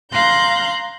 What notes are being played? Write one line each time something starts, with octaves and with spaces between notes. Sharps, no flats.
F5 A#5 C6 F#6 G6